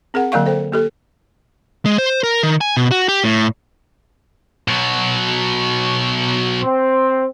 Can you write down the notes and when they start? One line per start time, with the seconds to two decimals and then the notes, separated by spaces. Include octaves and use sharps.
0.14 C4 G#4 A#4 F#5
0.32 D3 F#3 A#3 D5 F5 C#6
0.46 A4 C5 G5
0.72 A#3 G4 A4
1.86 G#3
1.98 C5
2.23 A#4
2.43 D#3
2.61 G#5
2.77 B2
2.91 F#4
3.08 G4
3.24 A2
4.68 B2 F#3
6.63 C4